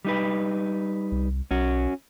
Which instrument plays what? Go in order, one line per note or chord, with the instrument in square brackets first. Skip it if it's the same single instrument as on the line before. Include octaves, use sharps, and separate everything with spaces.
[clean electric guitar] G3 D#4 B4
[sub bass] C2
[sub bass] B1 [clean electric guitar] C#4 F#4